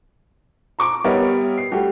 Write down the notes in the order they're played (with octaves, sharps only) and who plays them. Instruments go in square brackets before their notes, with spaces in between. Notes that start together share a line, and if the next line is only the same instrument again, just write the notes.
[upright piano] A#5 C#6 D6
G3 B3 A#4 C#5 D#5 E5
C7
G3 A3 F#4 G4